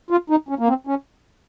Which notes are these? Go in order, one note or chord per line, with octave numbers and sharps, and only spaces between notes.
F4
D#4
C#4
A#3
C4
C#4